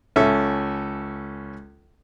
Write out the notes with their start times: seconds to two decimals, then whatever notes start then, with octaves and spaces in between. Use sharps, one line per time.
0.16 C#2 C#4 A4 E5